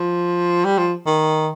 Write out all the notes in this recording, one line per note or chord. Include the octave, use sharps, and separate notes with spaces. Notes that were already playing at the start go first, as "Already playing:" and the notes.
Already playing: F3
G3
F3
D#3